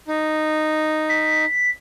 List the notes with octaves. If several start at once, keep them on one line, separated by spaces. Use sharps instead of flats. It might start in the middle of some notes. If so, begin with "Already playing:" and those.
D#4
B6